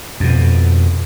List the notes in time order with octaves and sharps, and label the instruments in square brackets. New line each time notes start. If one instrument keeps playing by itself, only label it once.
[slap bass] F2 B2